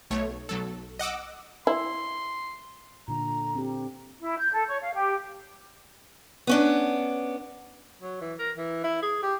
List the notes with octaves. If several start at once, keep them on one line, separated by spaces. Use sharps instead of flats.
B1 A3 C#5
B1 F#3 A4
D#5 F#5 D6 E6
E4 C6
A#2 D3 A#5
C4 G4
E4
G6
A4
C#5
F5
G4
B3 C#4 D4
F#3
E3
A#4
E3
E4
G#4
G4